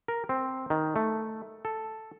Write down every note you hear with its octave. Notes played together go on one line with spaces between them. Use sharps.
A#4
C4
D#3
A3
A4